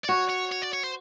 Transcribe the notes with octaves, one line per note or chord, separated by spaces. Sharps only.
D5
F#4 C#5
C#5
C#5
D5
C#5
C5